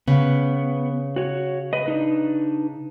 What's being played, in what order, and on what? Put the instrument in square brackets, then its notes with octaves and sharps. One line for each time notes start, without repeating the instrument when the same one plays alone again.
[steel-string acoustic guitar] C#3 [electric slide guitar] B3
[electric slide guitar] F#4 C#5
B4 D#5
D4 D#4 B4